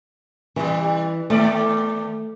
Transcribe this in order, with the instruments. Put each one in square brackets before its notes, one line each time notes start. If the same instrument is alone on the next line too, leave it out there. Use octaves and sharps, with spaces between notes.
[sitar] C3 G3 [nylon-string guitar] E3
[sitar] D#2 D5 [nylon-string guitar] A3